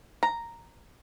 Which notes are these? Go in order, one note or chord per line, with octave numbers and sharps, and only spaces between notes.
A#5